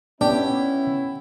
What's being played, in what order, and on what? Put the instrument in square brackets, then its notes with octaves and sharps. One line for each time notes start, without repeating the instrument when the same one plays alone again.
[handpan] B3 [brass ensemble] C#4 E4 [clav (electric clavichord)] D4 [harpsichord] G4